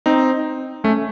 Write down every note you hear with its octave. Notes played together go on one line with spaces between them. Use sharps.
C4 D#4
A3 C#4